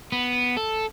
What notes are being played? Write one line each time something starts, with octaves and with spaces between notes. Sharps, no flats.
B3
A4